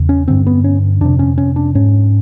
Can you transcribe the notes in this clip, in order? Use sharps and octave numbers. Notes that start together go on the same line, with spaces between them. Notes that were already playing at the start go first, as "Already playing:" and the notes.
Already playing: E2 C#3
C#4
G2 D3 C4
B3
C#4
F2 C3 D4
C#4
C#4
D4
G#2 C#4